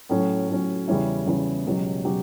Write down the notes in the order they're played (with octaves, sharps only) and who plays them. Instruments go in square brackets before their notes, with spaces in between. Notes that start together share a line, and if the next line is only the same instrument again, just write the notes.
[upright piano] A2 F#3 C#4
A2 F#3 C#4
E2 C#3 G3 C#4 E4
E2 C#3 G3 C#4 E4
C#2 B2 F#3 C#4 G4
B2 F#3 C#4 G4